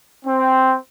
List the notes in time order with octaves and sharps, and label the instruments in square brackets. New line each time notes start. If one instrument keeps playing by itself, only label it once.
[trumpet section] C4